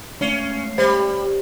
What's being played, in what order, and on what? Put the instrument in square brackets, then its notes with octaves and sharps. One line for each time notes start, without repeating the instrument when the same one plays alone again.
[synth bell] G#3 A3 C7 [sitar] C#4
[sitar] G3 [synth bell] C5